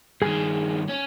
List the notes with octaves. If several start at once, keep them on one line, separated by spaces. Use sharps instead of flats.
G2 D#3 G#4 G#5
C#4